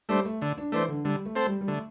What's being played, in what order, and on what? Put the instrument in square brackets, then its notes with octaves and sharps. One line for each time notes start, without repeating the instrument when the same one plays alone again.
[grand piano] G3 [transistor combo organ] A3 D4 C5
[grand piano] A3
[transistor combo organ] D3
[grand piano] D4
[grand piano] E3 [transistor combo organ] A3 D4 C5
[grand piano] D3
[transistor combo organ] D3 [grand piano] G3
[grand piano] A3
[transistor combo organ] C4 A4 C5
[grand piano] G3
G3
[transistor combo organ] D3 [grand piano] A3